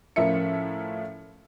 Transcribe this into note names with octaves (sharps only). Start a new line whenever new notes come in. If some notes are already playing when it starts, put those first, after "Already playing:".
A2 F3 C#4 A#4 E5 C#7